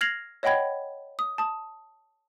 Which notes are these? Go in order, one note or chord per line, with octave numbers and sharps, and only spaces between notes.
F6 G#6 A#6 C7 F7 F#7
C#5 D#5 F#5 G5 B5 G#6
D#6
A5 D#6